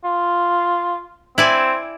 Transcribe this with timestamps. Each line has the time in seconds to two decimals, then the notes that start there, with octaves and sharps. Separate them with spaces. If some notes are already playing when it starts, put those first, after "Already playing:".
0.05 F4
1.38 C4 E4 D5 G#5